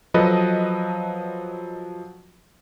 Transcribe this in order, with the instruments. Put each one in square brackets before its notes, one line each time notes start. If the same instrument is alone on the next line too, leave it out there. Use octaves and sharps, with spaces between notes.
[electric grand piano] F3 F#3 A4 B4 D#5